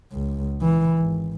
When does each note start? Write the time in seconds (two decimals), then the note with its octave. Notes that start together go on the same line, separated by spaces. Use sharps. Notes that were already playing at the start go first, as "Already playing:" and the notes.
0.12 C#2
0.62 E3
1.00 G#1